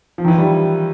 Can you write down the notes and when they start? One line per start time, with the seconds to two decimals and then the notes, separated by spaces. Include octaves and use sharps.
0.18 F3
0.24 D#3
0.28 E3
0.38 G3